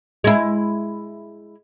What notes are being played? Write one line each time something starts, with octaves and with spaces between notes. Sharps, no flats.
G#3 E4